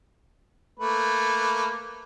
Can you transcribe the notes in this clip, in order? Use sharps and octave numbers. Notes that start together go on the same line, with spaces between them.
A3 A#3 B4